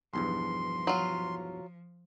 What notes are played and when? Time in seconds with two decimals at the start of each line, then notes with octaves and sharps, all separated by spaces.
0.14 B1 E2 G2 F3 C6
0.87 F#3 F4